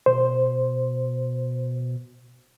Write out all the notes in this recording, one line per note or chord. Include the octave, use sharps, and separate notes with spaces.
B2 C5